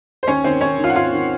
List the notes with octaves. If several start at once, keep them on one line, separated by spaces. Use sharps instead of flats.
C5
D#2 C#4 C#5
D#3 C4 C5
D#2 C#4 C#5
D#3
F4 F5
F#5
D#2 F4 F5
D#3